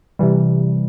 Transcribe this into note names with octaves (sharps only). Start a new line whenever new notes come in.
C3 E3 G3